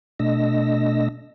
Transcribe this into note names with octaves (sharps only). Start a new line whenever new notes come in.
B2 A3 D4 D#5 E6 A#6